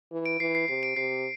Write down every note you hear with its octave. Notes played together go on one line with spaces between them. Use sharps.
E3
D7
E3 C7
C7
C3 C7
D7
C3 C7